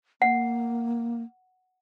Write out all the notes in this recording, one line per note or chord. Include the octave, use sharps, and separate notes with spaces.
A#3 F#5